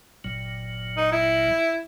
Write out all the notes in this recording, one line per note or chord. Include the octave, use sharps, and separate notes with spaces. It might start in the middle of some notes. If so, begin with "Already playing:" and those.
G1 A#2 F#3
D#4
E4